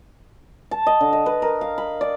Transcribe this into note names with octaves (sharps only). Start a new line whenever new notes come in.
A5
D#5
D3
D#5
B4
A#4
F5
B5
D5